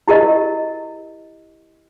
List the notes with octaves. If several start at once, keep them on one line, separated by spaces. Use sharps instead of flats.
E4 G4 A#4 D#5